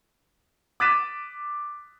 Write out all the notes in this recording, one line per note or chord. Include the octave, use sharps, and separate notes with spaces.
D6 F#6 A6 B6 D#7 E7